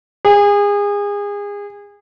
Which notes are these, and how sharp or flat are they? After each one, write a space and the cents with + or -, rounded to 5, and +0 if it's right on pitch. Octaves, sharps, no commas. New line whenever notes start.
G#4 -30